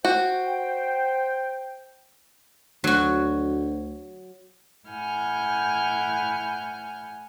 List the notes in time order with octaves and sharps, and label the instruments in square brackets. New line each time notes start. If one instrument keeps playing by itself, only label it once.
[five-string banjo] F#4 [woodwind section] C5 G5
[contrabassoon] D2 [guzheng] F#3 F#4
[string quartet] A2 E4 F#5 G#5 F6 G6